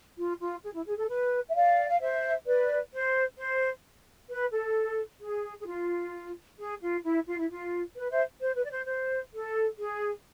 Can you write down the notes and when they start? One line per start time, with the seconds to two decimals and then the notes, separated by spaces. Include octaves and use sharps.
0.17 F4
0.40 F4
0.63 G#4
0.74 E4
0.86 G#4
0.97 A4
1.09 B4
1.49 E5
1.54 D5 F5
1.90 F5
2.00 C5 E5
2.46 B4 D5
2.92 C5
3.37 C5
4.29 B4
4.52 A4
5.21 G#4
5.60 G#4
5.66 F4
6.58 G#4
6.81 F4
7.04 E4
7.27 F4
7.38 E4
7.49 F4
7.96 B4
8.10 C5 E5
8.41 C5
8.56 B4
8.64 D5
8.71 C5
8.87 C5
9.33 A4
9.79 G#4